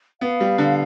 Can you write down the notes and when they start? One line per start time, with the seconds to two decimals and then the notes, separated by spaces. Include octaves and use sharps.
0.21 B3 F5
0.40 G3
0.58 D3